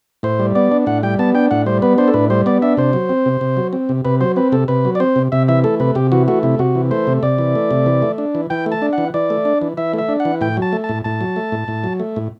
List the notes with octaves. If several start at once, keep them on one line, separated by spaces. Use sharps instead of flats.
A2 C5
G3
B3 D5
D4
A2 F#5
G3 G5
B3 A5
D4 G5
A2 F#5
G3 C5
B3 B4
D4 C5
A4
A2 B4
G3 C5
B3 D5
D4 E5
C3 C5
F#3
C4
C3
C3
F#3
C4
C3
C3 B4
F#3 C5
C4 B4
C3 A4
C3 B4
F#3
D5
C4 C5
C3
C3 E5
E3 E5
A3 A4
C3 B4
C3 G4
E3 F#4
A3 F#4
C3 E4
C3 F#4
E3
A3 C5
C3
C3 D5
E3
A3
C3
E3
A3
D4
E3
E3 G5
A3
A5
D4
F#5
E3
E3 D5
A3
D4
E3
E3 E5
A3
E5
D4
F#5
E3
A2 G5
F#3
A5
A3
A5
A2
A2 A5
F#3
A3
A2
A2
F#3
A3
A2